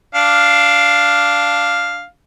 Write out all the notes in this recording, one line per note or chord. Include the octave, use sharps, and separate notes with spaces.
D4 F5